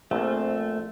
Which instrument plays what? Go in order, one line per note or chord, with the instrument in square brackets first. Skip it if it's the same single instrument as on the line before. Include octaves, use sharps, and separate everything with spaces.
[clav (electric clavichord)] A#1 [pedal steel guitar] A3 [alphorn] C4